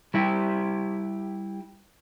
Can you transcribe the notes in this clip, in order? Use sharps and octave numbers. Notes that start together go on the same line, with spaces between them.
G3 E4 G4